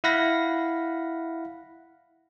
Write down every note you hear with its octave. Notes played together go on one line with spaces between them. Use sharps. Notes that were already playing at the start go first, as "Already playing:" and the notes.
E4 F5 F#5 B5 A#6